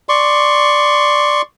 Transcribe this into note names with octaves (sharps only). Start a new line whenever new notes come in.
D5 C6 C#6